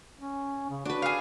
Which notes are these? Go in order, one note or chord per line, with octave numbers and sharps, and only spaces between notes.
C#4
C#3
D4 F#4 B4
G#4 F5